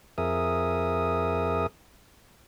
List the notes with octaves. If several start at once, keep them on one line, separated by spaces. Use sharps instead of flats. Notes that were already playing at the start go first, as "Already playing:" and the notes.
F2 G#4 A#4 E5 D#6